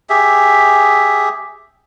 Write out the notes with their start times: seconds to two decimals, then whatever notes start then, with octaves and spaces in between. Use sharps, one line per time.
0.10 G4 G#4 E5